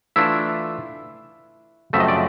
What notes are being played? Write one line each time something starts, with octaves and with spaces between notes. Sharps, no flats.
E3 A3 D4 E4 F4 E5
F#2 C#3 F3 A3 C4 E5
D#5
D5